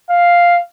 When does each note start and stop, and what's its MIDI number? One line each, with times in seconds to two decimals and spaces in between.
0.10 0.61 77